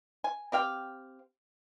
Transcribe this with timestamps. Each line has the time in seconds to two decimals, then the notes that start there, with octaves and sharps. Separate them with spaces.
0.24 G#5
0.52 C4 G4 F5 G5